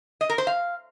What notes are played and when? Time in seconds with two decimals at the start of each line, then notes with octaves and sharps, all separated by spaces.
0.21 D#5
0.29 A#4
0.38 C5
0.47 F5